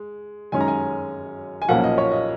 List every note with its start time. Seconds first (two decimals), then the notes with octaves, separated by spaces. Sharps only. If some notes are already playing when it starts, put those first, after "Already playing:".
Already playing: G#3
0.52 F#2 D#3 G#3 C#4 G#5
0.61 A#5
0.68 G#5
1.62 G#5
1.68 B1 A#2 F3 A#3 C#4 F#5
1.84 D#5
1.98 C#5
2.12 D#5